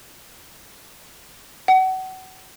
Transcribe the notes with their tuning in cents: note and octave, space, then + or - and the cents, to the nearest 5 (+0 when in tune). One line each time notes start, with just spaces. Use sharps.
F#5 +30